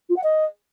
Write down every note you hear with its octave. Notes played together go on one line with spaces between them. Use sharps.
F4
F#5
D#5